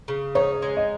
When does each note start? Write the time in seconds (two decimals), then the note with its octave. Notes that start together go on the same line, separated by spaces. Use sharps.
0.08 C#3
0.35 D#4 C#5
0.62 G#3
0.77 D#5